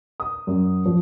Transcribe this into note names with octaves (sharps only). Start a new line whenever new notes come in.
D#6
F#2
F3